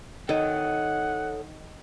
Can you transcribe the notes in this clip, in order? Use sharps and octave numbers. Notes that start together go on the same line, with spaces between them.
D#3 A4 C#5 D#5 F#5